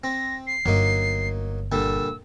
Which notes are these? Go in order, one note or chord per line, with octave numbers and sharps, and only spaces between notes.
C4 A#6
C7
G1 F#3 A#3 D#4
A#2 D3 G3 E6